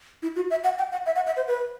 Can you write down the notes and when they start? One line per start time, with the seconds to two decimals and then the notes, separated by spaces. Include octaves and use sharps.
0.23 E4
0.36 F#4
0.51 E5
0.64 F#5
0.78 G5
0.92 F#5
1.06 E5
1.16 F#5
1.26 E5
1.37 C5
1.48 B4